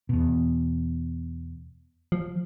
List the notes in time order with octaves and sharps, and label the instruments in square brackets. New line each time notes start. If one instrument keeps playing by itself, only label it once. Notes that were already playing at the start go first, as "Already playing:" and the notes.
[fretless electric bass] E2 B2
[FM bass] F3